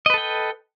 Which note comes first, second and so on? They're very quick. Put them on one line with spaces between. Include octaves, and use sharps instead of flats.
D#5 B4 A4 G5